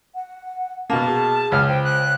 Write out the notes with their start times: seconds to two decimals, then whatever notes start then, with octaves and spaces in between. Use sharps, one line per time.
0.15 F#5
0.90 B2 A#3 A5
1.07 G#4
1.52 C#2 F6
1.68 C5 G5
1.84 F#6